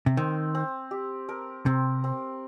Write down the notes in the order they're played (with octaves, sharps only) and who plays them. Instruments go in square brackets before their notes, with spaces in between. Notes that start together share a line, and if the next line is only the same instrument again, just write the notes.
[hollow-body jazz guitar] C3
[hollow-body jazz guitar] D#3 [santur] C4
[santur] C4
G4
A#4
[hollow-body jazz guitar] C3 [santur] C4
[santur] C4